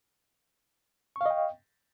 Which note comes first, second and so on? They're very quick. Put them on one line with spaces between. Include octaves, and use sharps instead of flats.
C#6 F5 D#5 G5